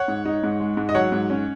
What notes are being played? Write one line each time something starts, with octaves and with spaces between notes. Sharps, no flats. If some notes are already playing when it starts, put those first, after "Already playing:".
Already playing: C#5 F#5
G#2
D#4
G#2
G#3
G#2
D#5
F#3 C#5 F#5
G#2
C#4